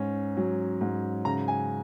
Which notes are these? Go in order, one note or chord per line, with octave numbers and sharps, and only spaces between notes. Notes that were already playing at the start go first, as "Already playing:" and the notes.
Already playing: G#2 C#4
F#3
G#2
C#3 A#5
G#5